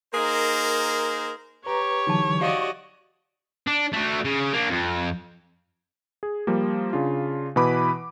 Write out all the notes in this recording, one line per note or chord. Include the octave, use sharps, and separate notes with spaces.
A#3 D#4 G#4 A#4 C5
G4 B4 C#5 A#5
D3 E3 F#3 D#4 A5
F#4 G4 D5 D#5 F5 C#6
D4
A3 F#4
C#3
A#3 D4
F2
G#4
F3 G3 A#3
C#3 D4 F4
B2 E3 B4 B5 D6